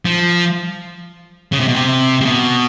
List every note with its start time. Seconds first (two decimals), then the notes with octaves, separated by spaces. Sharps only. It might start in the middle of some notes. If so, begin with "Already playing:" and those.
0.05 F3
1.52 C#3
1.60 C3
1.68 B2
1.76 C3
2.21 C3
2.25 B2